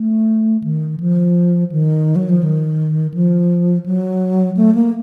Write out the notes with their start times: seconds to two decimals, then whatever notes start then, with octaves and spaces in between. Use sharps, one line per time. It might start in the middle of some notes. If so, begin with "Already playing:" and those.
Already playing: A3
0.64 D#3
1.00 F3
1.72 D#3
2.16 F#3
2.29 F3
2.43 D#3
3.14 F3
3.86 F#3
4.57 A3
4.75 A#3